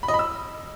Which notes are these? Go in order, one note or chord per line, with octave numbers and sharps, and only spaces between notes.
B5
D#5
B5
E6